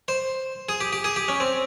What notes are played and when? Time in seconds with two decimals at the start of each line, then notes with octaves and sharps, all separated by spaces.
0.08 C5
0.69 G#4
0.81 G4
0.93 G4
1.04 G#4
1.16 G4
1.28 C#4
1.40 C4